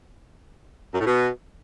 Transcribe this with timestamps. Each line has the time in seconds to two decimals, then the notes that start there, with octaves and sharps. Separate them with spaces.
0.94 F#2
1.00 A2
1.06 B2